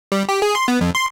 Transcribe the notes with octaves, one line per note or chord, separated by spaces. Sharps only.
G3
G4
G#4
C6
B3
F2
C6